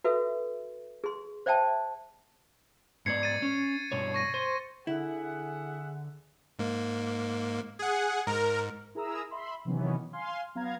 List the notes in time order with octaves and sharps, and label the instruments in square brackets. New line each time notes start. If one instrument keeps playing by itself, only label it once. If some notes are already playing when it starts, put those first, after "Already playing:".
[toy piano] F#4 A4 B4 E5
G#4 C6
C5 D5 E5 G5 A5
[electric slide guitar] G#2 B3 D5 [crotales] G#6 C7 C#7
[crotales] A6 D#7
[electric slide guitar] C#4
G2 B2 C#5
[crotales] C#6 A#6 D#7
[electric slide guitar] C5
[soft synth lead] D3 [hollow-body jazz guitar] E4 [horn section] G#4 E5 F#5
[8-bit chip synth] G#2 A#3
[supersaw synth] G#4 F#5
[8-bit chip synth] G#2 [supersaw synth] A#4
[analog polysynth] E4 G#4 A#4 A#5 D#6 E6
E5 B5 C6
C3 D#3 E3 F#3 B3 C#4
F5 G#5 C6
F#3 B3 F5 A#5 G#6